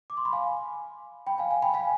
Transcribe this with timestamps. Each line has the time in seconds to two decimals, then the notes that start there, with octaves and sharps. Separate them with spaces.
0.10 D6
0.17 C6
0.25 B5
0.33 F5 G#5
1.27 G5 B5
1.38 F5 G#5
1.51 F5 G#5
1.62 G5 B5
1.74 F5 G#5